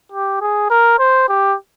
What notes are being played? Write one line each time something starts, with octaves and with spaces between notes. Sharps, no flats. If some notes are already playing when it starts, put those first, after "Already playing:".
G4
G#4
A#4
C5
G4